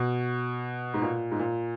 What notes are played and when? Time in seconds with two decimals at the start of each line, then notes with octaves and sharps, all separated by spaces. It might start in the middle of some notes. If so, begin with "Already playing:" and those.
Already playing: B2
0.94 G#2
1.02 A#2
1.31 G#2
1.39 A#2